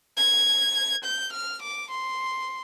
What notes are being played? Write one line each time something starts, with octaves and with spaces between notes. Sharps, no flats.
G#6
G6
F6
D6
C6